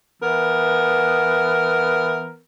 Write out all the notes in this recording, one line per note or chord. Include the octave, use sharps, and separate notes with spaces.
E3 B3 A#4